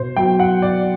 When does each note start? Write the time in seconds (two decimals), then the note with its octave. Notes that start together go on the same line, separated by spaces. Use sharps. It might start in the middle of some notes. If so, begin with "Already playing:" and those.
Already playing: B2 C5
0.16 F#3 B3 F#4 G5
0.40 F#5
0.62 B2 D5